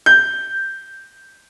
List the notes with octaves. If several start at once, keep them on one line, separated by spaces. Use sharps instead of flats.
G6